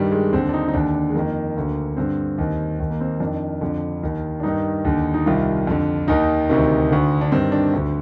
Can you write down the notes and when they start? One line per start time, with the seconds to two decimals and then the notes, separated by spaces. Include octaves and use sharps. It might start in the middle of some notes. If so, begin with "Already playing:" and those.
Already playing: G2 D#3 G3
0.12 G#3
0.32 D#2 D3 C4
0.49 D4
0.54 D#4
0.68 D#4
0.74 D#2 D3 D4
0.95 D4
1.10 G#3
1.15 F2 D#3 A#3
1.57 D2 D3
1.97 G2 D3 C4
2.38 D#2 D#3
2.80 D#2 D#3
2.90 A#3
3.01 C4
3.20 F2 D#3 D4
3.61 F2 D3
4.03 D#2 D#3
4.40 D4
4.43 G2 D#3 D#4
4.85 D#2 D3
5.14 D#4
5.26 C2 C3 D#3 F4
5.67 F2 D3
6.08 D#2 D#3 D#4
6.49 D2 C3 D#3
6.90 D2 D3
7.21 D4
7.32 G2 D#3 C4
7.52 D4
7.73 D2 D3